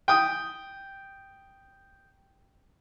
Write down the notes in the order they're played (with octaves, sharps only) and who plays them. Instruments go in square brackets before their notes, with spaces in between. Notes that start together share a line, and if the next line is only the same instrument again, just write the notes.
[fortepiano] G5 D#6